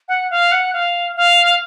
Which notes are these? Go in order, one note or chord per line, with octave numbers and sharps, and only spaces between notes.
F#5
F5
F#5
F5
F5